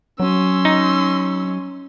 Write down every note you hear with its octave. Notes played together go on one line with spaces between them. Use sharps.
F#3 C#4 C6 E6
D#4